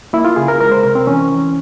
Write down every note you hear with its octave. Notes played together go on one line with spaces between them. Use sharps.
A#3 E4
F4
C#3 G#4
A#4
G#3 A#4
C5
C3 A#4
C4
E3 C#4
E3